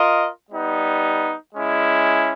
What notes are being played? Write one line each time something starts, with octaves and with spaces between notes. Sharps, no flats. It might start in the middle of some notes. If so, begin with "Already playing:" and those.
Already playing: F4 A#4 D#5
G3 B3 D#4
G#3 C#4 E4